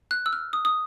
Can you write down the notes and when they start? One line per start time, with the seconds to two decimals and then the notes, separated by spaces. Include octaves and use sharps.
0.11 F#6
0.26 E6
0.33 F6
0.53 D#6
0.65 D#6